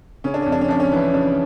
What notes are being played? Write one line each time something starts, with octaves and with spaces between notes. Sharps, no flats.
C#3 C#4
D4
F2 C#4
D4
C#4
F2 D4
C#4
E3
C#3 D4